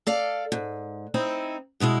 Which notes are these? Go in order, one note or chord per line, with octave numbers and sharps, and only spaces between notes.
A4 D5 F5
G#2
C4 D#4 E4
G2 B2 G#3 E4